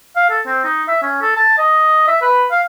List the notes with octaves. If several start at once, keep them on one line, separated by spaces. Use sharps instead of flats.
F5
A4
C4
D#4
E5
C#4
A4
A5
D#5
E5
B4
F5